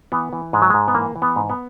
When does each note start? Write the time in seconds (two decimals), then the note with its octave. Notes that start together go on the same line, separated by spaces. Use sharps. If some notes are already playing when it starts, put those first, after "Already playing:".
0.12 E3 B3
0.33 E3
0.53 G#2 G#3
0.62 F#3
0.70 G#2 G#3
0.88 B3
0.94 E3 A#3
1.16 E3
1.22 B3
1.36 G#2
1.50 B3